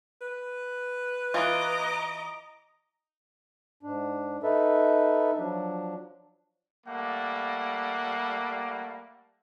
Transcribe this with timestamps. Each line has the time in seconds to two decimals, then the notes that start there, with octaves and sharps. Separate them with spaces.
0.21 B4
1.34 E3 F4 D#5 A#5 D6
3.83 G#2 D4
4.43 D#4 A4 B4 E5
5.38 F3 F#3 D4
6.87 G3 A3 A#3 F#5